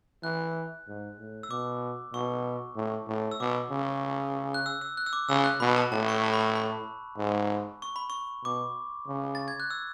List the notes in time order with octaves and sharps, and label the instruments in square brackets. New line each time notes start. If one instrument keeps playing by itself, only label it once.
[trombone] E3 [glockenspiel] F#6
[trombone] G#2
A2
[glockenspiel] E6
[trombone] B2 [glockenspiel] D6
[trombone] B2 [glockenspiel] C#6
[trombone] A2
A2
[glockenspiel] E6
[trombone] B2 [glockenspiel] D6
[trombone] C#3
[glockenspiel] F#6
E6
E6
F#6
E6
D6
[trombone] C#3 [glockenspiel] E6
[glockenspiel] F#6
[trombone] B2 [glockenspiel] B5
[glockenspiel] A5
[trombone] A2 [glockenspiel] A5
[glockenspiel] C#6
A5
B5
A5
B5
[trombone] G#2
[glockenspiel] C#6
B5
C#6
[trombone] B2 [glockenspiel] D6
[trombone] C#3
[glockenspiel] A6
G#6
F#6
E6